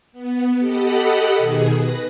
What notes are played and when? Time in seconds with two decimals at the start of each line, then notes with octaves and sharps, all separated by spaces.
0.12 B3
0.59 G4 A4 D#5 F#5 B5
1.38 B2 D#3 G#4
1.76 B4 F#6 A#6